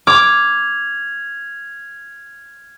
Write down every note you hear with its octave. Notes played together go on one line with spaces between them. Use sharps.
D6 F6 G#6 F7